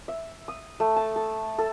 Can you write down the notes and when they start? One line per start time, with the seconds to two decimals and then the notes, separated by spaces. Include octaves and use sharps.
0.08 E5
0.48 D#6
0.80 A3
0.96 A5
1.16 A4
1.58 A4